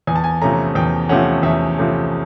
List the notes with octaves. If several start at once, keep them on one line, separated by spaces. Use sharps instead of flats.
E2 G#5
A5
G#5
C3 F3 A3 C#4 A#5
E2 G5
C3 F3 A3 C#4 F#5
E2 E5
C3 F3 A3 C#4